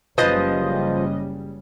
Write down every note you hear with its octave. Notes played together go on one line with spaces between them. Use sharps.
F#1 C#3 F3 G3 B4 C5 D#5